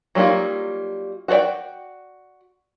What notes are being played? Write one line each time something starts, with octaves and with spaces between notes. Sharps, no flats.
F#3 G3 A#3 D#4 F4
F#4 G#4 A4 D5 G5